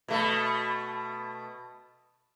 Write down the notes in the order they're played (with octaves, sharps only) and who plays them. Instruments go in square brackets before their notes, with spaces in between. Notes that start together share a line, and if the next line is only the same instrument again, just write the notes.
[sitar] B2 A3